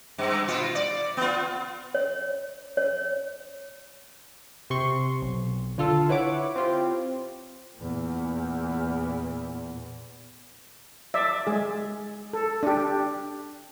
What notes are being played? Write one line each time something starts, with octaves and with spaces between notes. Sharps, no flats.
G2
B2 F4
D5
B3 F4
C#5
C#5
C3 C6 C#6
B1
D3 F4 A4
E4 B4 C#5 F#5 D6
C4 F4 G4
E2 A#2
D5 E5
G#3 G#4
A4
D4 G4